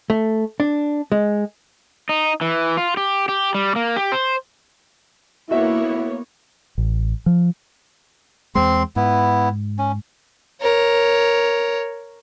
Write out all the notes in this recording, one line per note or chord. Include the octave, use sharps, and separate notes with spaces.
A3
D4
G#3
D#4
E3
F4
G4
G4
G3
A#3
G4
C5
A#3 B3 E4 F#4 C#5 E5
A1
F3
E2 G#3 C4 C6
G#2 B3 E4
C#4
A#4 C#5